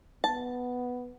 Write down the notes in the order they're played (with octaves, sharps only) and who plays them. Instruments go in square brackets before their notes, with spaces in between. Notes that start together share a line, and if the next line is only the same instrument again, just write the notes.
[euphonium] B3 [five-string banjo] A5